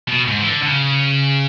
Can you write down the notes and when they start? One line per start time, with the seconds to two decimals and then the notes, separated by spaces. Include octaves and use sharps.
0.08 B2
0.28 G#2
0.40 E3
0.48 D3
0.63 D3
0.67 C#3